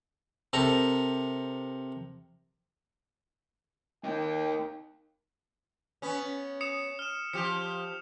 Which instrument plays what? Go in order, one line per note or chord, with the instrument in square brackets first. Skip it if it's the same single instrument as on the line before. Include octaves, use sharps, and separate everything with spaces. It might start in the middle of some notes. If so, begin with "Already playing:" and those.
[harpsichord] C3 A4 A#4 A#5
[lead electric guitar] A#3 D#4 [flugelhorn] G5
[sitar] B3 C#4
[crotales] D#6 C#7 E7
F6 E7
[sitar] F3 G4 [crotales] C#7 F7